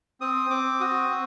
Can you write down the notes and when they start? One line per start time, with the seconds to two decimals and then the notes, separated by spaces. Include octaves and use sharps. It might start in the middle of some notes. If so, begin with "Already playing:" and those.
0.21 C4 D#6
0.50 C4 D6
0.80 F#4 D#6
1.11 C4